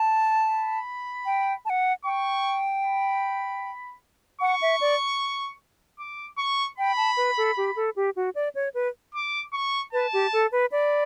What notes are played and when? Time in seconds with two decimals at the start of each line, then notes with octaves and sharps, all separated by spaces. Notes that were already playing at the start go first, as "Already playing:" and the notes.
Already playing: A5
0.47 B5
1.26 G5
1.65 A5
1.70 F#5
2.05 G5 C#6
2.84 B5
4.41 F#5 C#6
4.62 E5
4.81 D5
5.99 D6
6.38 C#6
6.78 G5 B5
6.97 A5
7.17 B4
7.37 A4
7.57 G4
7.76 A4
7.96 G4
8.16 F#4
8.35 D5
8.55 C#5
8.74 B4
9.15 D6
9.53 C#6
9.93 B4 A5
10.13 G4
10.33 A4
10.52 B4
10.72 D5 B5